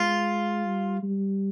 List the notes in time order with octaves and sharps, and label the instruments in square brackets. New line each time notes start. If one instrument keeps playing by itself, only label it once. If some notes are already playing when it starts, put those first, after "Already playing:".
Already playing: [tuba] G#3 [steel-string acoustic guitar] F4
[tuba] G3
G3